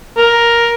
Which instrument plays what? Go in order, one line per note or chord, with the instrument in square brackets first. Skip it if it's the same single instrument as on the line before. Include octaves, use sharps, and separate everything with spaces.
[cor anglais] A#4